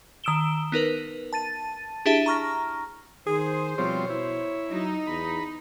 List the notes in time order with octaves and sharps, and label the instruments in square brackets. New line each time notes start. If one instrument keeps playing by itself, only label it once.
[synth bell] D#3 D#6 E6 D7 E7 G7
B3 D#4 A#4 B4
A5 A6 D#7
D4 E4 G4 G#4 E5 A5
A#5 C#6 F6 A#6
[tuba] D#3 [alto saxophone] G#4 [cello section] C5
[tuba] B2 [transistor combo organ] F3 G3 C4 [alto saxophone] C#5
[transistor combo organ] E4
[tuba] F#3 [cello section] D#4
[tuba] E2 [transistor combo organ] B5